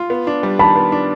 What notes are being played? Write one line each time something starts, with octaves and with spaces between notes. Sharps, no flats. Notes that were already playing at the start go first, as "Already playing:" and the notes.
Already playing: F4
B3
D4
G3
D#3 A5 B5
B3
D4